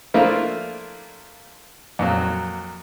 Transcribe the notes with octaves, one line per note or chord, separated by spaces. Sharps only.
F3 A3 A#3 D4 E4 F4
F2 A#2 F#3